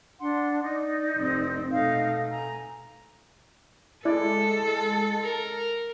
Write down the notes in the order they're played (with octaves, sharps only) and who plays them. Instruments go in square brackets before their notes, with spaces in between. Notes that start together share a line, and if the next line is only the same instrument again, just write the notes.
[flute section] D4 F#5 C6
D#4 D5
[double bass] F1 C4
[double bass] B2 A3 [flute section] D#4 F5
[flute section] G#5 A#5
[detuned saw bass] G#3 [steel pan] E4 D5 [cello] A4
[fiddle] A#4